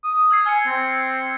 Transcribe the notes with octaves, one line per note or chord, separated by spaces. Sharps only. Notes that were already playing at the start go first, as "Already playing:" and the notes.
D#6
E6 G#6 C7
G#5 F6 C#7
C4